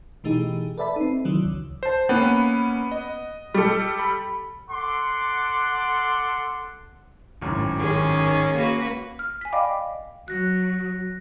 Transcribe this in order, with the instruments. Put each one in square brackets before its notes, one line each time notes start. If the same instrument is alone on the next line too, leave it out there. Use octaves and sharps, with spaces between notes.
[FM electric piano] B2 E3 A3 D#4 G4 G#4
A4 B4 D5 E5 A5 B5
C4 D#4
C3 D#3 E3 F#3 D4
C#2
[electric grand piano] C5 A5
[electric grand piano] A#3 C#4 [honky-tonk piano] B3
[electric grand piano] D#5
[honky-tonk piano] G3 A4
[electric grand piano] B5
[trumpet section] A4 F#5 C6 D6
[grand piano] G#1 F#2 A2
[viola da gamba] D#3 G#4 [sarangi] C#4
[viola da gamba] A#3 F#4 B4
[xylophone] F6
G#5 B6
D5 D#5 F5 G5 B5 D6
[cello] F#3 [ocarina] F#4 [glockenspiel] F#6 A#6